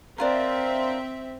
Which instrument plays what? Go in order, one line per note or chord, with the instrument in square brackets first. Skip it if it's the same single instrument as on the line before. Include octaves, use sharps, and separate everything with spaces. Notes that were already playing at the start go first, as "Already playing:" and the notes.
[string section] C4 E5 [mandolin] D4 F4 A#4